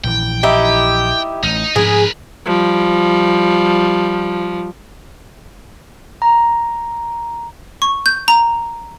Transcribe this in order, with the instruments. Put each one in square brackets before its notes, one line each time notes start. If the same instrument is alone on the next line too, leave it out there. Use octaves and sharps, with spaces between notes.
[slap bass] A#1 E3 [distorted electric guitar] G5
[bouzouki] D#4 E4 G4
[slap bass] A1 [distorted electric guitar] D#4
[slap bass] G#2 F3 D4 [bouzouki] G#4 [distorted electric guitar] A#4 B4
[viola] F3 G3
[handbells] A#5
[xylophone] C#6
G6
A#5